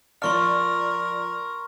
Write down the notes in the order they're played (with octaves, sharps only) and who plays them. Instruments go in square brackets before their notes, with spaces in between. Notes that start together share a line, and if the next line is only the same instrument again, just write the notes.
[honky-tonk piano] F3 D5 [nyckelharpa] A#4 [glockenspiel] C6 C#6 F6